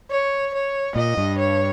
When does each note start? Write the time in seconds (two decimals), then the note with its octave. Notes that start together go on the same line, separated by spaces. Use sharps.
0.11 C#5
0.54 C#5
0.96 A#2 D#5
1.17 G2
1.39 C#5